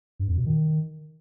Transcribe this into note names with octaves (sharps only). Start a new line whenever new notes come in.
G2
F2
B2
D#3